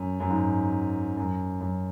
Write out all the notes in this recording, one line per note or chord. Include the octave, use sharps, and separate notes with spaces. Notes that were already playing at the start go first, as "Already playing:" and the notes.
Already playing: F#2
F#2
G#2
F#2
F#2